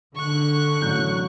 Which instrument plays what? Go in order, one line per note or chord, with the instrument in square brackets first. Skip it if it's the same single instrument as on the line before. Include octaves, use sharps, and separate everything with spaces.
[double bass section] D3 [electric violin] C#6 F#6
[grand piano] A1 F#3 G6